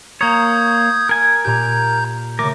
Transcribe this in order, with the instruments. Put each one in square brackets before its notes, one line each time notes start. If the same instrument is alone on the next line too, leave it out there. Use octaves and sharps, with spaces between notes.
[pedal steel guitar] A#3 C#5 [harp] A#5 [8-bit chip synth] D#6 G6 G#6
[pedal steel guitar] A#4 G#5
[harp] A#2 G4 [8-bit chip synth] A#5 G6
[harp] C#3 A3 [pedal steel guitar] A#4 [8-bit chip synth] D6